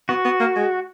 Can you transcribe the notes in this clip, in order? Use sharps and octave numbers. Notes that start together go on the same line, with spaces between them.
B3 F#4
B3
A#3
G#3